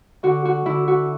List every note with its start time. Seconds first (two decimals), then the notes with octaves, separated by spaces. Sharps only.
0.23 D3 F#4
0.45 F#4
0.65 D3 E4
0.88 F#4